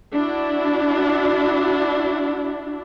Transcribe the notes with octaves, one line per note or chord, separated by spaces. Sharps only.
D4 E4 F#4